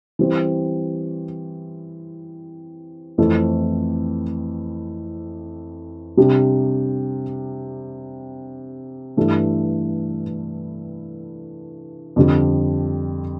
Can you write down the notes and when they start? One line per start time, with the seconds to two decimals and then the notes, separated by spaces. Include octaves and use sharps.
0.19 E3 G3 C4
3.18 F2 E3 A3 C4 E4
6.17 C3 G3 D4
9.17 G2 E3 A3
12.16 F2 D3 G3